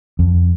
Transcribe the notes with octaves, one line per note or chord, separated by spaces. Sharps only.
F2